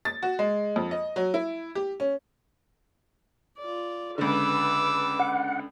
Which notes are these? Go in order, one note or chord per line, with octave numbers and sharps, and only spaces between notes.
A6
F#4
G#3
F2
D#5
F#3
E4
G4
C#4
F4 D5
C#2 D3 B4 D6 E6
F#5